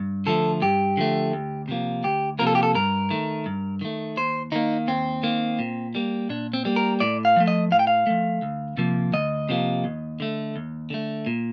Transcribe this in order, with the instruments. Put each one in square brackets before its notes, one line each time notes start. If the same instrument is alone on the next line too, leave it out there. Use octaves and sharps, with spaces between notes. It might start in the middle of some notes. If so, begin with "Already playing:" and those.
Already playing: [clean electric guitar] G2
D3 F3 A3 A4
G2 G4
D3 F3 A3
D2
C3 F3 A#3
D2 G4
C3 F3 A#3 A#4
A4
G4
A4
G2 A#4
D#3 A3
G2
D#3 A3
D#2 C5
D#3 A#3 D#4
D#2 C4
D#3 A#3
A#2
G3 A#3
A#2 D4
C4
G3 A#3
A#4
A2 D5
F5
F3 A3
D#5
A2 F5
G5
F5
F3 A3
D2
C3 F3 A#3
D2 D#5
C3 F3 A#3
D#2
D3 A3
D#2
D3 A3
A#2